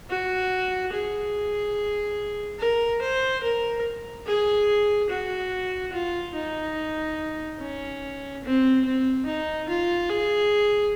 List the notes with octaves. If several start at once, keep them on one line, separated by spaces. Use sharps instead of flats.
F#4
G#4
A#4
C5
A#4
G#4
F#4
F4
D#4
C#4
C4
C4
D#4
F4
G#4